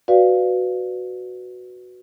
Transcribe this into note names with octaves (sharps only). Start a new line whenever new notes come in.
F#4 B4 D5 F5